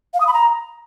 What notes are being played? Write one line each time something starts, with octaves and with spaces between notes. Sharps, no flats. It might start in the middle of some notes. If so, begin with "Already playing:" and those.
F5
D#6
B5
A#5